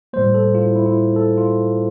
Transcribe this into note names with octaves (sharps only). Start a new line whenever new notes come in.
A2 G3 A#3 C5
A4
F4
E4
E4
E4
A4
F4